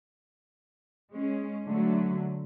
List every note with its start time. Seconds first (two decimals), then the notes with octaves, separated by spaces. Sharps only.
1.11 G#3 C#4
1.67 D3 F#3 A3